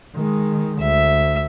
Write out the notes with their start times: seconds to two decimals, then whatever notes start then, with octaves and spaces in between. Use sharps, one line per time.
0.16 D#3 G#3
0.82 D2 E5